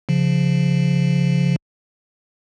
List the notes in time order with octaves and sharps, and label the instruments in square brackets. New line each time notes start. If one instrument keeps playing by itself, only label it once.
[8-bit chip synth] C#3 F3